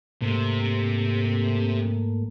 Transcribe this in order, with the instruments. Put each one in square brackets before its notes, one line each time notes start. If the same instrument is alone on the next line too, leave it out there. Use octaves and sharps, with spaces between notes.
[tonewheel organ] G#2 A3 A#3 [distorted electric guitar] C3